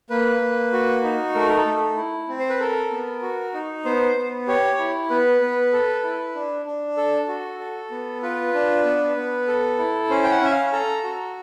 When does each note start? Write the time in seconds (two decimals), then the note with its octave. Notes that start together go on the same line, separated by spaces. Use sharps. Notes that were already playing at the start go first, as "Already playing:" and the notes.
0.10 A#3 B4
0.41 A#3
0.73 F#4
1.04 D#4
1.35 A3 A#4
1.50 A#4
1.56 A4
1.66 A3
1.97 E4
2.29 C4
2.39 C5
2.50 B4
2.60 A4 A#4
2.91 B3
3.22 F#4
3.54 D#4
3.85 B3 C5
4.16 B3
4.48 G4 C#5
4.79 E4
5.10 B3 B4
5.41 B3
5.73 A4
6.04 E4
6.35 D4
6.66 D4
6.97 A4
7.28 F#4
7.60 A4
7.91 B3
8.22 F4 B4
8.54 D4
8.84 B3
9.17 B3
9.48 A4
9.79 E4
10.09 C#4 C5
10.24 G5
10.31 F#5
10.41 C#4 E5
10.52 F5
10.73 A4 A#5
11.04 F#4